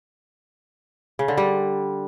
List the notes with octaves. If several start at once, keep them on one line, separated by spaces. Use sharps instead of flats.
C#3
D3
G3